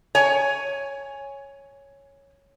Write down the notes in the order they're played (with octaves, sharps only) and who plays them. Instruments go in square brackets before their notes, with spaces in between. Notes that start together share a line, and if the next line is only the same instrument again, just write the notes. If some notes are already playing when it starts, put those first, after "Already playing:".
[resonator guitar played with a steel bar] C#5 G#5